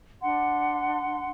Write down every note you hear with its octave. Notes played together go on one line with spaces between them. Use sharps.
D4 F#5 C6